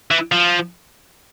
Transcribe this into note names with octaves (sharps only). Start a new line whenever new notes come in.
E3
F3